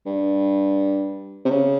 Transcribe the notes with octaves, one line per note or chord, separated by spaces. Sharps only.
G2
C3
C#3